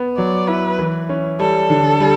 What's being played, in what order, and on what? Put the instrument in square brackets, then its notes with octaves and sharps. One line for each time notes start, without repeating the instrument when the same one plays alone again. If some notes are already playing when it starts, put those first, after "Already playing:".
Already playing: [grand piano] B3
[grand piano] F#3 [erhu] D5
[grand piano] E4 [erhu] B4
[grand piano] E3
C#4
[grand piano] G3 [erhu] A4
[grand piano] D3
G3